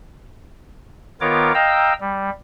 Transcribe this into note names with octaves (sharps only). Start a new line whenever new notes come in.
D#3 B3 F4 A#4 C#5 D6
D#5 F5 G5 A#5 E6
G3